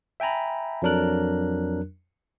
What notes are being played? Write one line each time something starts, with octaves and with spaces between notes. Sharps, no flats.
E5 G5 G#5 A#5 B5
F2 F#3 D4 A#4 F#6